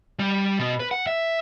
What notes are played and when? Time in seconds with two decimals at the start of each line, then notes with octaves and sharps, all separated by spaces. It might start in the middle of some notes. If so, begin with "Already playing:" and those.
0.19 G3
0.59 B2
0.80 B4
0.91 F#5
1.07 E5